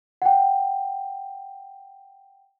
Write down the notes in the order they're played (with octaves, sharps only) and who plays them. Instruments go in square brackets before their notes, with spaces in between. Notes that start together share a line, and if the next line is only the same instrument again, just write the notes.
[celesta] F#5 G5